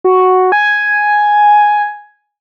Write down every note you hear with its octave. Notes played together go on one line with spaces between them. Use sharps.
F#4
G#5